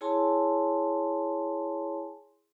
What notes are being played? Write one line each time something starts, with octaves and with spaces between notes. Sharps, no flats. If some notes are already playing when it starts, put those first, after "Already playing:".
E4 G#4 C#5 G#5 A5 C6